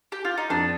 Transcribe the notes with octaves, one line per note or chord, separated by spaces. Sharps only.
G4
F4
D#4
F2 D4